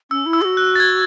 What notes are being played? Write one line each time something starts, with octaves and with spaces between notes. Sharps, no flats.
C#4 E6
E4
E6
G#4
F#4
F#6
A6
G#6